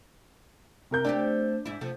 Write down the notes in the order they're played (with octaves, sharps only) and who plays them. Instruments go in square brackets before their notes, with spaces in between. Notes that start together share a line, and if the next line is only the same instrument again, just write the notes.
[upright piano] C3 A#4 G6
[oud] A3 C4 G4 [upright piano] D4 D5
[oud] G#2 E4
C3 F3 A3